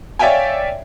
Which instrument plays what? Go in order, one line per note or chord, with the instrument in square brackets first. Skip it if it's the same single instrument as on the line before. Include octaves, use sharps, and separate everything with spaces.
[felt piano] C#5 D5 E5 F5 G5 G#5